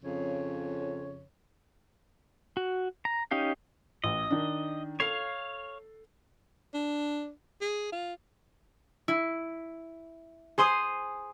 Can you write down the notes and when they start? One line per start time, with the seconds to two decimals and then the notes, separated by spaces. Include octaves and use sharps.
0.03 F2 C#3 C#5
2.57 F#4
3.05 A#5
3.31 C#4 D#4 G4 F5
4.04 A1 D#5
4.31 D#3 D4
5.00 A4 C#5 F5 C7
6.74 D4
7.61 G#4
7.92 F4
9.08 E4
10.58 G#4 C5 C6 D#6